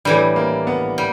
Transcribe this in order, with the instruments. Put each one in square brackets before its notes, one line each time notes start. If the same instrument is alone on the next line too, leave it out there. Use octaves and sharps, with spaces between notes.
[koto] A2 E3 G3 [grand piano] D4
[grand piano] A#3
B3
[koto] G3